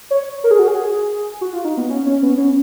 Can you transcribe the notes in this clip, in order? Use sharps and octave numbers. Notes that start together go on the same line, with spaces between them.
C#5
A#4
G#4
F#4
G#4
F#4
F4
D#4
B3
C#4
C#4
B3
C#4